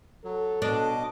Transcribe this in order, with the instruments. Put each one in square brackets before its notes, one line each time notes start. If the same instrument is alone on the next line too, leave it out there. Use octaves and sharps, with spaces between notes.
[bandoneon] F#3 [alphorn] A4
[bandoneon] B2 D#5 D6 [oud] D4